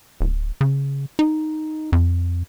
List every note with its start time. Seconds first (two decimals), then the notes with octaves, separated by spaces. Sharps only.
0.21 D1
0.61 C#3
1.19 D#4
1.92 F2